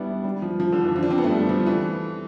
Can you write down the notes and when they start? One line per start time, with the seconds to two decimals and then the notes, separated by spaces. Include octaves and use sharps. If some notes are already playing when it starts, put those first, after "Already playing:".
Already playing: G3 B3 D4 E4
0.24 G3
0.42 F3
0.60 F3
0.72 D3
0.84 E3
0.96 F3
1.03 D4
1.10 C4
1.18 B3
1.24 A3
1.31 G3
1.49 F3
1.67 E3